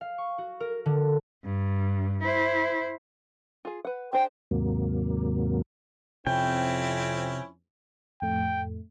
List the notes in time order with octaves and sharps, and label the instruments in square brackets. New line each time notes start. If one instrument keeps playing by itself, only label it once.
[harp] F5
C#6
F#4
A#4
D3
[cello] G2
E4 C5
[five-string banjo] F4 G#4
B4 F#5
[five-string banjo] D4 G#4 C5 [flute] G5
[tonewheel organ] D#2 G#2 C3 F#3 A#3
[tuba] F2 [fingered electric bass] C3 [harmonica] C4 C#4 E4 [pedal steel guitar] G5
[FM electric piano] F2 A2 A3 [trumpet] G5